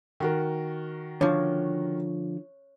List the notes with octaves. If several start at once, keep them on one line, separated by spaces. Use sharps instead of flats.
D#3 F#4 A#4
D3 F3 C#5